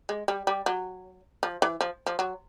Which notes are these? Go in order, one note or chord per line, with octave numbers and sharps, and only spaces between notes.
G#3
G3
G3
F#3
F3
E3
F3
F3
F#3